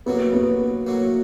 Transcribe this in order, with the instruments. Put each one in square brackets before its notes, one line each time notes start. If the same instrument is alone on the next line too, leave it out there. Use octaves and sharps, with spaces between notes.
[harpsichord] A2 F#3 A#3 [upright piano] B3
[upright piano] B3
[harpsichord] A2 F#3 A#3